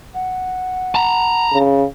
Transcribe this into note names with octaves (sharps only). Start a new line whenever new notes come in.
F#5
A5 A#5
C#3